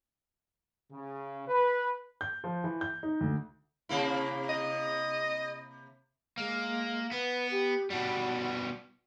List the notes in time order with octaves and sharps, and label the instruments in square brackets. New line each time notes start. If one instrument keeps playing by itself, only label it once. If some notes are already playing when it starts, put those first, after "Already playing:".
[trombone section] C#3
B4
[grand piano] G6
F3
E3
G6
D#4
D2
[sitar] C3 A#3 E4
[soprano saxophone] D#5
[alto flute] G#3 [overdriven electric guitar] A#3
[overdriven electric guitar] B3 [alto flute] B4
[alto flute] G4
[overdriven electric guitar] B2 G3 [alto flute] F#4